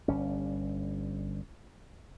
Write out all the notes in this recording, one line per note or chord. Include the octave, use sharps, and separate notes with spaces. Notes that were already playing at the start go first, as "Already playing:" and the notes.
G1 G3 C#4